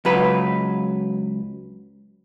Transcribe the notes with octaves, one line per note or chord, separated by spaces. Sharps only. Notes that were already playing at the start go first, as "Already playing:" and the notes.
C#2 F#3 B4